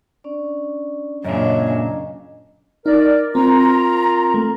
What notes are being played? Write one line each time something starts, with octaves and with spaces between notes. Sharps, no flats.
C#4 D4 D5
F#2 A#2 C#3 C#4 D4 D#5 A#5
D#4 A#4 D5
C4 F4 A#4 A#5
A3